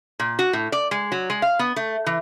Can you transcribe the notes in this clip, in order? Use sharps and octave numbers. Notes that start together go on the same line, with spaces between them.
A#2
F#4
A2
D5
G#3
F#3
G#3
F5
B3
A3
E3